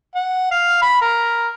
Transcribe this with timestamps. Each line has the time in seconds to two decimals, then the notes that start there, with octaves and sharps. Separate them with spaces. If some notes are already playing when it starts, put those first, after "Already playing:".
0.15 F#5
0.51 F5
0.82 B5
1.01 A#4